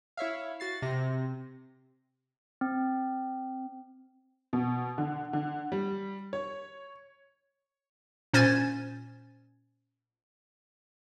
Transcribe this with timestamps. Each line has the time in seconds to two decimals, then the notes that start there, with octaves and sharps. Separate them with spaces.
0.17 E4 C#5 E5 F5
0.60 F#4 A6 C7
0.82 C3 A#6
2.61 C4
4.53 B2
4.98 D3
5.33 D3
5.72 G3
6.33 C#5
8.34 A#2 C#4 C5 G#5 G#6 A6